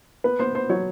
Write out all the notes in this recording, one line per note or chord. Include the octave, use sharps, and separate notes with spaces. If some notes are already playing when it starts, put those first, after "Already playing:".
B3 B4
B3 C5
B3 C5
F#3 C#5